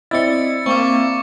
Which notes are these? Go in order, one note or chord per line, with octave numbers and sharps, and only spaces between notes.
C4 E4 D5 D#5 A6 C#7
A#3 C4 C#6 D6